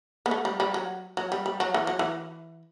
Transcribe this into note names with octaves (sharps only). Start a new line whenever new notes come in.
B3
A3
G3
G3
F#3
F#3
G3
G3
F#3
E3
F#3
E3